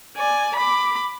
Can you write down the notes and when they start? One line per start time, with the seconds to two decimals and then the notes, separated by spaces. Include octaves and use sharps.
0.17 D5 G#5
0.56 B5 D6